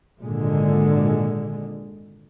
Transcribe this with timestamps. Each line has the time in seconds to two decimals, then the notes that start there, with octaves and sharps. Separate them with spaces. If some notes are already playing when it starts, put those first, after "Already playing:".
0.21 G#1 A#2 D3 G#3